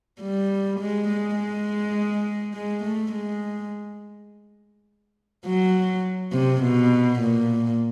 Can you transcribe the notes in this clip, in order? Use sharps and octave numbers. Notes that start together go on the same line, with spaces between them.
G3
G#3
G#3
G#3
G#3
A3
G#3
F#3
C3
B2
A#2